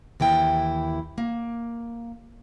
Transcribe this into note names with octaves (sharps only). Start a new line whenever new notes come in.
D#2 E3 E4 G5
A#3